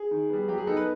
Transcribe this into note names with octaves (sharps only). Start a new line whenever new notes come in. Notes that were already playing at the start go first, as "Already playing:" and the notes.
Already playing: G#4
D#3
G3 B3
F#3 G4
G#4
B3 D#4 A4
B4